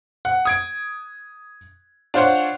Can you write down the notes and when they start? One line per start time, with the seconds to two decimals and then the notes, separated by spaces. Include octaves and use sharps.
0.25 F#5
0.45 D#6 G#6 D7
2.14 D4 F4 C5 C#5 F#5